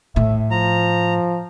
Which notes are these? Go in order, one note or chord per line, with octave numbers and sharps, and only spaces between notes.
A2 E5
F3 A#5